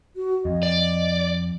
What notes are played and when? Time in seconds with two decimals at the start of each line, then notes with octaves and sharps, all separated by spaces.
0.16 F#4
0.45 F2 D#5
0.63 D5